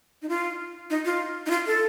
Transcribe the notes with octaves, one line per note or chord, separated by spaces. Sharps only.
D#4
F4
D#4
F4
D#4
F4
A4